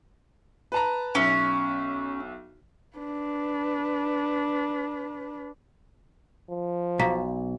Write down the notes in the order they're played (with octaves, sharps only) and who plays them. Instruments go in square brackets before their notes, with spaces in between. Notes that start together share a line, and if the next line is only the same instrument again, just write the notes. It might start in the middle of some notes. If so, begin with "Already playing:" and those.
[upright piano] B4 A5 A#5
[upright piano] B1 E5 [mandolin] C#4
[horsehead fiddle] D4 B4
[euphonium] F3
[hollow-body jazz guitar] B1 [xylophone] F5 A#5 B6